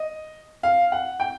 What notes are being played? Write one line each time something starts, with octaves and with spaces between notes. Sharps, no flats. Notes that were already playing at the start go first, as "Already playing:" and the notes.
Already playing: D#5
F5
F#5
G5